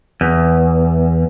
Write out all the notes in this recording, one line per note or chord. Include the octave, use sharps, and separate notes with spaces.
E2